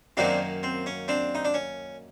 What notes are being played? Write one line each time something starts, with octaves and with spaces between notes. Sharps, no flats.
F#2 D#3 F#3 A#3 C4 D4
C4
C#4
C4 D4
D#4
D4
C#4